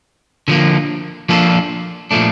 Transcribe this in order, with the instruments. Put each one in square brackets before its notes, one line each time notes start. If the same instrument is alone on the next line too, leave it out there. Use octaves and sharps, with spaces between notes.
[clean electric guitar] D3 F3 A#3
F3 A#3 D4 F4 A4
A#2 F3 A3 D4